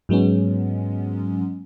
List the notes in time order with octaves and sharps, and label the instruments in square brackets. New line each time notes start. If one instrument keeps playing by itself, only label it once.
[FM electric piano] G#2 F#3 G#3 B3 C#4